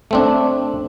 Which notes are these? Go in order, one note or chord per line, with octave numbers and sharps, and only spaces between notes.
A3 C4 D4